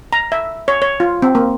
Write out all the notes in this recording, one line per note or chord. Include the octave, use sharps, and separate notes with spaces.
A#5
E5
C#5
C#5
F4
C4
A#3